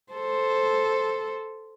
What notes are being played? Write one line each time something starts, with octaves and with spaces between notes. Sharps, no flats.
A4 C5